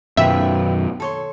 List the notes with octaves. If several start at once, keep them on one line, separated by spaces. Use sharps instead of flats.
F#2 B2 D#3 F4 B4 E5 G5
A4 C#5 C6